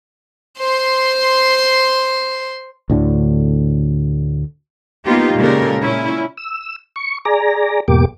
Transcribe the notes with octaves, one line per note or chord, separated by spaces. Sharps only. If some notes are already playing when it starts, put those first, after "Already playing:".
C5 C6
D2 A2 D3
A#3 B3 D#4 F4 G4
A#2 C#3 G#3 G4 A4 A#4
A#2 C#4 E4
E6
C#6
G#4 D5 A#5
E2 G#2 B2 A#3 G4 D6